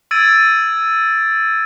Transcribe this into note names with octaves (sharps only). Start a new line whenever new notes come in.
E6 G#6 A6 D7 D#7